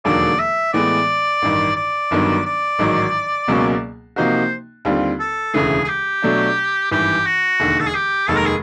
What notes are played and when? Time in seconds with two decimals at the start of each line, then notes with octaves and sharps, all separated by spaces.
0.05 E1 D#2 D3 F#3 A#3 D5
0.39 E5
0.73 A2 E3 G#3 B3 D5
1.42 A1 G2 D#3
1.76 D5
2.11 G1 G2 D#3 F#3 B3
2.45 D5
2.79 A1 G#2 D#3 F#3
3.48 C#2 B2 F#3 A#3 C#4
4.16 C3 F3 A#3 D#4 F#4 C5
4.85 D#2 D3 G3 C4 F4
5.19 A4
5.54 E1 D2 C#3 E3 A3 G#4
5.84 G#4
5.88 G4
6.22 B2 F#3 A3 D4
6.91 G#1 G2 E3 G4
7.26 F#4
7.60 E1 D#2 D3
7.80 A4
7.86 G#4
7.94 G4
8.28 F1 D#2 D#3 G#3 A4
8.36 A#4
8.46 G#4